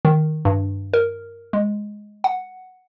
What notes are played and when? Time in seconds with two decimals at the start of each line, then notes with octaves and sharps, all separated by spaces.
0.05 D#3
0.45 G2
0.94 A#4
1.53 G#3
2.24 F#5